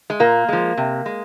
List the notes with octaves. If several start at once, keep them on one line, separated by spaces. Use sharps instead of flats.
G#3
A#2 A#3
F3 G#3
C3
G#3